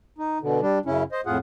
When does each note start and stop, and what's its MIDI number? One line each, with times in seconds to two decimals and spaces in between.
0.18 0.38 63
0.42 0.61 47
0.42 0.61 50
0.61 0.79 55
0.61 0.79 62
0.86 1.03 42
0.86 1.03 49
0.86 1.03 61
0.86 1.03 64
1.12 1.21 72
1.12 1.21 75
1.26 1.38 41
1.26 1.38 45
1.26 1.38 65
1.26 1.38 68
1.26 1.38 78